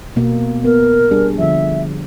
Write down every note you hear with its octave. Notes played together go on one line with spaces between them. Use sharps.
B2 A#3
B3 A#4
G3 D4 G#4
D3 F3 E5